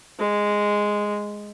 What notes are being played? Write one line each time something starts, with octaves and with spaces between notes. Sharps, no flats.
G#3